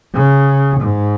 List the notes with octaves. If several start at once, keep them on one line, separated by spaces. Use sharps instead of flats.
C#3
G#2